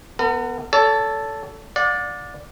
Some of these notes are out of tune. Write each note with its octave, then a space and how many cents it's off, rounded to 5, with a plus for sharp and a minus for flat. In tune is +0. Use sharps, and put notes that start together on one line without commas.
B3 +0 A#4 -45
A4 +0 C#5 +45
D5 +0 F#5 -45